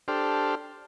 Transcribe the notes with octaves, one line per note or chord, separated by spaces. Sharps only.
D4 G4 A4 C5 F6